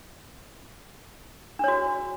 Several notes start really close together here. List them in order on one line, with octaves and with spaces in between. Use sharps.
D4 C#5 F#4